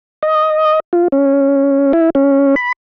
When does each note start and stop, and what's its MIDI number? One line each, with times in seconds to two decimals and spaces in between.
0.23 0.80 75
0.93 1.08 65
1.12 1.92 61
1.93 2.10 64
2.15 2.55 61
2.56 2.72 83